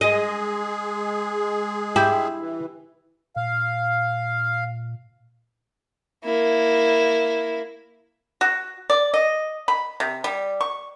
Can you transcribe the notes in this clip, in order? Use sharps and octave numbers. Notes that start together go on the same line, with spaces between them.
G#3 G#4 D#5
E4 G4
E3
A#2 F5
A#3 E4
F#4
D5
D#5
B5
C3
G3
C#6